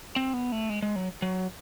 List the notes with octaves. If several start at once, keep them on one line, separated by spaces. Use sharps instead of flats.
C4
B3
A3
G#3
G#3
F#3
F#3